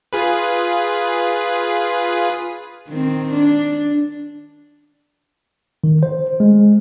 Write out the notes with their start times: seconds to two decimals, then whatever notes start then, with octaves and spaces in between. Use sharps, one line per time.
0.13 F4 G#4 B4
2.88 D#3 C4
3.32 D4
5.84 D#3
6.03 C5
6.40 G#3